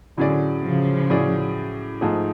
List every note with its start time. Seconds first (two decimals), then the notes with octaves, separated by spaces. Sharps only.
0.17 A2 D3 F#3 C#4 G#4 D5
0.63 C#3 F3
1.10 A2 F#3 C#4 G#4 D5
2.01 G#2 F3 A3 F4 G#4